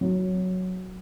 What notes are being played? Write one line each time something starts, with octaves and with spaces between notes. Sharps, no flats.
F#3